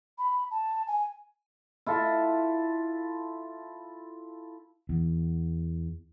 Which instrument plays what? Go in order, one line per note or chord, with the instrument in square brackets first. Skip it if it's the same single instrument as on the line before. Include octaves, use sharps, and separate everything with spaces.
[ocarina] B5
A5
G#5
[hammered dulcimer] E4 F4 A4
[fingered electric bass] E2